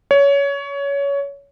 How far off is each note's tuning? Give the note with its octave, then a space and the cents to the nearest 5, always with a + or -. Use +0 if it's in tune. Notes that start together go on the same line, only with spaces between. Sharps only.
C#5 +20